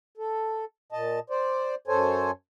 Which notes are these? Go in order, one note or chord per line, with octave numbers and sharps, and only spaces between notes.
A4
A#2 D#5 A5
C5 D5
F#2 A4 C5 C#5 G#5